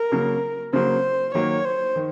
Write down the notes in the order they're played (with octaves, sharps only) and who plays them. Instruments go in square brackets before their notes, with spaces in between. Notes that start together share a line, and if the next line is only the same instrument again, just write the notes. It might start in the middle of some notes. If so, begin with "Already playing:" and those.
Already playing: [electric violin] A#4
[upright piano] C#3 F#3 A#3
[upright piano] C#3 F#3 A#3 [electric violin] C5
[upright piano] D#3 F#3 A#3 [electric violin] C#5
[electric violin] C5
[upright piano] D#3